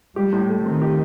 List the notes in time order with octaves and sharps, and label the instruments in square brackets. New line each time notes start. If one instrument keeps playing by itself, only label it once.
[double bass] G3 [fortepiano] G4
[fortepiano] A2
A3
[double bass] D#3 [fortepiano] C4
[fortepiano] G4